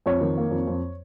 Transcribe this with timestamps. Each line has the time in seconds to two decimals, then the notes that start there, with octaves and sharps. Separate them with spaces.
0.06 F2 C#5
0.21 D#3
0.37 A#3
0.51 F2
0.67 F2